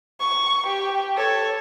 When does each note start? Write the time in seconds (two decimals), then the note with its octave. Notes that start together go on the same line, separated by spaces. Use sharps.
0.20 C#6
0.67 G4
1.17 A4 C#5